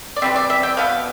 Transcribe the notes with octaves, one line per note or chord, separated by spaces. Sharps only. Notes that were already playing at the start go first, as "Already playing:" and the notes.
D5
E3 G3 C4 E5
D5
E5
G5
B2 B3 F5